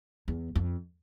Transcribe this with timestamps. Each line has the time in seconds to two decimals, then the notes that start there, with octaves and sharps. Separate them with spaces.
0.28 E2
0.55 F2